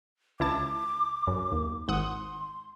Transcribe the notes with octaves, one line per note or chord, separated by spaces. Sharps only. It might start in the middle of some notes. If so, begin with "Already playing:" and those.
C#2 E4 A5 D6
F#2
D#2
G#1 F#5 C6 D#6